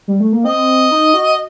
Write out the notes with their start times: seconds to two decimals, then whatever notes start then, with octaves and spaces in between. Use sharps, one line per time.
0.08 G3
0.20 A3
0.32 A#3
0.45 C4 D#5
0.91 D#4
1.14 F#4